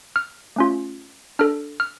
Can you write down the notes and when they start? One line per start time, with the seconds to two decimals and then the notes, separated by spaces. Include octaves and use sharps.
0.16 F6
0.56 A3 C#4 F4
1.39 D4 A4 F6
1.80 F6